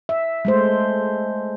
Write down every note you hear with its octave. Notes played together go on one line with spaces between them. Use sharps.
E5
G#3 A3 C5